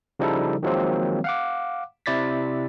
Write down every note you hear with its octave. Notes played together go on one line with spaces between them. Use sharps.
C#3 F3 G3 D#4 E4 A4
D#3 F3 F#3 G#3 A#3 C4
F5 F#5 D6
C3 E4 D5 A6 B6